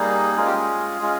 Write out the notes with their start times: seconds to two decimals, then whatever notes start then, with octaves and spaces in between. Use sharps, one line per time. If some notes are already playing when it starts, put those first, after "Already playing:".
Already playing: G3 A#3 D#4 G#4
0.37 G#3 C#4 F4 G#4
0.46 G4
0.56 G#4
1.01 G#3 C#4 F4